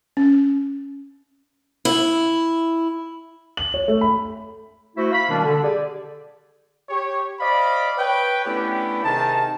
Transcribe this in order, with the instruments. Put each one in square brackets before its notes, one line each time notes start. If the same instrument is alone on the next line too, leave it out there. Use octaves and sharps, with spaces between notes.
[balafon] C#4
[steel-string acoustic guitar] E4
[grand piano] F#7
C#5
A3
B5
[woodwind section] A3 E4 F#4 C5 E5
F5 B5
B2 D#3 G3 A#3 D4
D3
G4 G#4 D5
[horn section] G4 C#5
C5 D5 D#5 F5 B5
B4 C#5 G5
A3 B3 C#4 D4 E4 G4
C3 D#3 D#4 G#4 A5